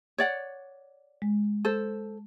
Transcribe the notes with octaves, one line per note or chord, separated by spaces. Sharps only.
C#5 D5 F#5
G#3
A4 C5